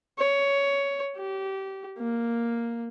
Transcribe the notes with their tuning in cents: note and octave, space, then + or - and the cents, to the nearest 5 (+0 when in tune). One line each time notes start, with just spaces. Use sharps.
C#5 +10
G4 -25
A#3 +0